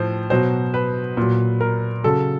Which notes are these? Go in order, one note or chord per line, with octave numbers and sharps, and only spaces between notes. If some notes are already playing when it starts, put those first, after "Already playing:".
Already playing: A2 F3 C5
B2 F#3 C5
B4
A#2 F#3
A#4
C#3 F#3 A4